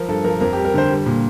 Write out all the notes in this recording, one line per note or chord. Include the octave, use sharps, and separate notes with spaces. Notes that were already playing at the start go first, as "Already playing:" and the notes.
Already playing: F3 A#4
G2 A4
F3 A#4
F2 A#4
G4
G3
A#4
D3 C5
G3
A#2